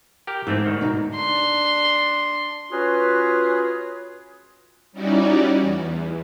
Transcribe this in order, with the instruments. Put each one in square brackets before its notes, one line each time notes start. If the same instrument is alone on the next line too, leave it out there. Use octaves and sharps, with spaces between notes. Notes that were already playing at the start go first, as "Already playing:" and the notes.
[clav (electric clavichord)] G4 A#4 G5
[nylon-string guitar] G#2 D#4 [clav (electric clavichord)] E3 A3 C4
[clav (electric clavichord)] D2 D#3
[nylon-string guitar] B2 D#4
[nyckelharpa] D4 C6
[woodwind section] C#4 F4 F#4 G#4 B4
[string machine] G3 C#4 D#4 E4 F#4 D5
E2